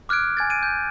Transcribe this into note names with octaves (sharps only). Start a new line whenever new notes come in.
D6 F6 F#6 G#6 D7
G#5 G#6 A6
D7 D#7
G6